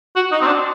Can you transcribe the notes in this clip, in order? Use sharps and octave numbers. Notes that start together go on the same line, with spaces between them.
F#4
D#4
C4
D4